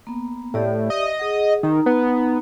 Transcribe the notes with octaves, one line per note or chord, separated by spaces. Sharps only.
A#3 B3
A2 G4 D5 E5
D#5
G#4 F#5
D#3 D#4 A#5
B3